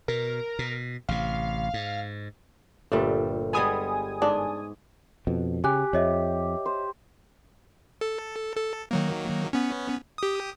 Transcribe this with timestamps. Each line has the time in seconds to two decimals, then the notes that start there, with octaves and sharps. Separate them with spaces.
0.08 B2 A#4
0.59 B2
1.09 A1 C3 F5
1.74 G#2
2.92 G1 A#2 G3 A3
3.53 G3 G#3 B3 G#5 D#6
4.22 G#2 D4
5.27 F2 B2
5.64 C#3 G4 G#5 F#6
5.93 F2 C#5 D#5 E5
6.66 C5
8.01 A4
8.56 A4
8.91 D#3 F#3 A#3
9.53 B3 C#4
10.18 G4 D#6